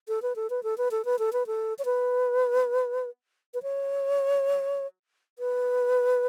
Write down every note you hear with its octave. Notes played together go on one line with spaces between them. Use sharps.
A4
B4
A4
B4
A4
B4
A4
B4
A4
B4
A4
C#5
B4
B4
C#5
B4